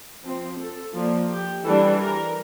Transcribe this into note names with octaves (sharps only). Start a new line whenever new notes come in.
F3 C4
A4
F3 A#3 D4
G4
E3 G3 D4 A4
A#4